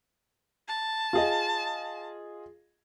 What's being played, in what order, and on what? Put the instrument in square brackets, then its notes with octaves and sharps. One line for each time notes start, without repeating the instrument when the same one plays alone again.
[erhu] A5
[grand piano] F4 G#4 D#5